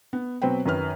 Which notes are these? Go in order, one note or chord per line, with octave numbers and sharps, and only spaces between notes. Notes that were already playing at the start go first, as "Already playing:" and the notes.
B3
B2 F#3 C4 B4 C5 G5
F#2 D#3 B4 F6